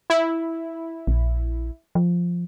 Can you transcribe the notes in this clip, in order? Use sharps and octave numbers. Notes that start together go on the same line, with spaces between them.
E4
A#1
F3